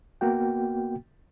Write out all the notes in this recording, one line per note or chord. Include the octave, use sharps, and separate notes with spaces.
A#3 B3 F#4 G5